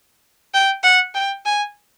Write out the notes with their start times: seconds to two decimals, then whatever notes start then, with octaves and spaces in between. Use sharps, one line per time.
0.54 G5
0.83 F#5
1.14 G5
1.45 G#5